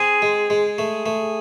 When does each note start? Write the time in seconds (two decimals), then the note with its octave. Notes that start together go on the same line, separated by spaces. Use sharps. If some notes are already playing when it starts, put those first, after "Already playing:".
Already playing: C4 G#4
0.22 G#3
0.50 G#3
0.78 A3
1.06 A3